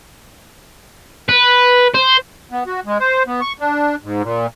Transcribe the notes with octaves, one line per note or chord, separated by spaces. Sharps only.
B4
C5
B3
F#4
G#3
C5
B3
C#6
D4
G#2
A#2